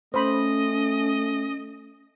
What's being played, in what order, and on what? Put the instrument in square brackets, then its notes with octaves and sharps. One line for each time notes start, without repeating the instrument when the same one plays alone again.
[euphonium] A3 [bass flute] C#4 [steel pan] C5 B5 [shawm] D#5